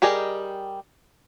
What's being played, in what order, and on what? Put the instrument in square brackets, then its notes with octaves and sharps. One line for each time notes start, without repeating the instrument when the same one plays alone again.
[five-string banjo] G3 G4 G#4 A#4 D#5